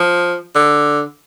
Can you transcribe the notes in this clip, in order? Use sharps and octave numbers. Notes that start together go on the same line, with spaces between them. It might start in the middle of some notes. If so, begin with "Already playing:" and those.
Already playing: F3
D3